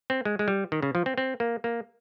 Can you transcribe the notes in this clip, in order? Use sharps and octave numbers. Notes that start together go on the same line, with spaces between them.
C4
G#3
G#3
G3
D#3
C#3
F3
C4
C4
A#3
A#3